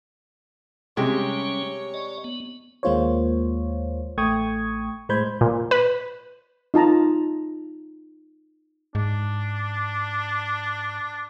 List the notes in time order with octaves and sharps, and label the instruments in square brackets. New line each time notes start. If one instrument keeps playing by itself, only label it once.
[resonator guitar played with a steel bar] C3 G4 [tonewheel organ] G3 C#4 [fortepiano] G#3 [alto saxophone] C#5
[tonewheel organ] D5 D#5
B3
[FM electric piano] D#2 G#3 A#3 F4 C5 C#5
A1 A3 G5 C#6 D#6 G#6
A2 G#3 C5 B5 G6 G#6
[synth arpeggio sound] A#2
B4
[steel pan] D#4 F4 A5 A#5
[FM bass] G#2 [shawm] D4